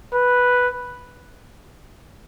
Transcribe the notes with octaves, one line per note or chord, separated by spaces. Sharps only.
B4